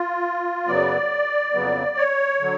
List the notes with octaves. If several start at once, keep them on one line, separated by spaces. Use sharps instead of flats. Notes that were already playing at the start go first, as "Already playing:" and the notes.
Already playing: F4
F#2 C#3 F#3 B3 D5
F2 C#3 F#3 B3
C#5
D3 F#3